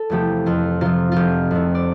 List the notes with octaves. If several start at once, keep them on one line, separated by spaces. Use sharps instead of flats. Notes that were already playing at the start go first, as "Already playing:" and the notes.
Already playing: A4
E2 C3 F3 A3 G4
F2 F4
C3 F3 F4
F1 F4 G4
F2 C3
D5